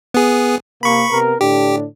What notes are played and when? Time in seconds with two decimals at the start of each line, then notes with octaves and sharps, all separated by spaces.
0.14 B3 G#4
0.83 C3 A#3 B5 C#6
1.11 C3 B3 A#4
1.41 A2 D3 D4 G4